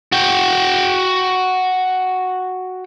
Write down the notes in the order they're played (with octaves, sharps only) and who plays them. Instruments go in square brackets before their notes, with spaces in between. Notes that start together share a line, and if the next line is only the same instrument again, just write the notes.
[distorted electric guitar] F#4 G5